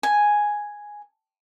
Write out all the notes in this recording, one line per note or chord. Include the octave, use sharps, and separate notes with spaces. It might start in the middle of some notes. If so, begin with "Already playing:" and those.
G#5